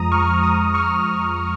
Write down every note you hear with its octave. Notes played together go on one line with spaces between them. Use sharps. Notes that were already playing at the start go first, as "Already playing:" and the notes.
Already playing: F2 F3 G#3 A#5 D#6
C#6 F6
C#6 F6
A#5 D#6
C#6 F6